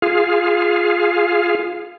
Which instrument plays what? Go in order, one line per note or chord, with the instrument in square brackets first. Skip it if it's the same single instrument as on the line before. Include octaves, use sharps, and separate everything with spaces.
[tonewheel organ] F4 G#4 F5